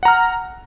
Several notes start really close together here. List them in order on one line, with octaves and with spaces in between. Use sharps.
F#5 A#5 F6